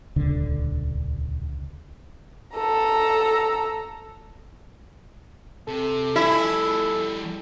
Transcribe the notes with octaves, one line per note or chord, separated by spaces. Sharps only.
D#1 C#2 D3
A4 A#5
C3 A4
G3 E4 F4 G#4